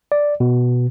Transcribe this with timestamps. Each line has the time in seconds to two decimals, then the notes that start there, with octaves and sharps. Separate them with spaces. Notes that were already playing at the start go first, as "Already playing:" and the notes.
0.12 D5
0.40 B2